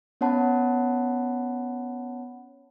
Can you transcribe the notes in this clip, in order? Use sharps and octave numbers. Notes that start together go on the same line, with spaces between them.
B3 C#4 C#5 F#5 A5 B5